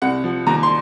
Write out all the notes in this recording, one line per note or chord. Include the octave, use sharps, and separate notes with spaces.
C2 F#5
F3
D#2 A#5
C6